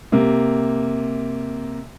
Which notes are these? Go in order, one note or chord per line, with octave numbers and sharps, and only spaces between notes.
C3 A#3